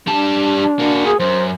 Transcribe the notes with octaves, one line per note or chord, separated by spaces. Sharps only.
G3 D4 A5
A#3 F#4
G#4
F#2 C5